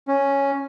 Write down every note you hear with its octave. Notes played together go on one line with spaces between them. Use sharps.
C#4